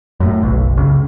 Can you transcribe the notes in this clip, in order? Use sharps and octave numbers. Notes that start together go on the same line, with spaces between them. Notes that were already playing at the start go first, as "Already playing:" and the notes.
F#2 A2
F#1 B1
C#2 C#3